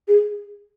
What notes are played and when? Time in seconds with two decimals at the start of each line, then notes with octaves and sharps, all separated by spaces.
0.08 G#4